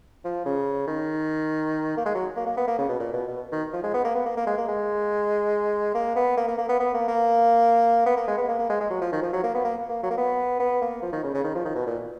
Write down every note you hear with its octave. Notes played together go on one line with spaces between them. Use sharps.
F3
C#3
D#3
A#3
G#3
F#3
A#3
A#3
B3
A#3
C#3
B2
A#2
B2
B2
D#3
F3
G#3
B3
A#3
B3
A#3
A#3
G#3
A#3
G#3
A#3
B3
A#3
A#3
A#3
B3
B3
A#3
A#3
B3
A#3
G#3
B3
A#3
A#3
G#3
G#3
F#3
F3
D#3
F3
F#3
A#3
B3
A#3
A#3
F#3
A#3
B3
B3
A#3
F3
D#3
C#3
C#3
D#3
F3
D#3
B2
A#2